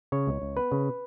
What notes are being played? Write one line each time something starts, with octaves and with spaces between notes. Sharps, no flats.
C#3 C#5
C#2
C#2
B3 B4
C#3